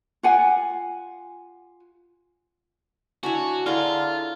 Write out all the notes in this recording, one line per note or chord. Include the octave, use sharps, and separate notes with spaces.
F4 G4 F#5 G#5
D4 E4 F#4 C#5 G#5
D3 E4 F4 G#4 A#5 F6